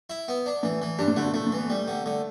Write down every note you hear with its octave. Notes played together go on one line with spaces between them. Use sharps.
E4
B3
D4
A2 E3
E3
G2 D4
A2
D3 A3
B2
A2 A3
A2
E3
B3
G3 A3
D3
D3 A3